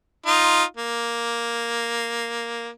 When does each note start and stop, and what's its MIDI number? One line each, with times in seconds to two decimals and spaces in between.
0.26 0.63 63
0.26 0.63 65
0.77 2.69 58